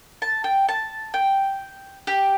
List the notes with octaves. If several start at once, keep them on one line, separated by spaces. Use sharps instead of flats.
A5
G5
A5
G5
G4